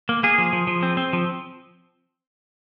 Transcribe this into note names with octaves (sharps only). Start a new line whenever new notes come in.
A#3
A#3 G#4
F3
F3
F3
C4
C4
F3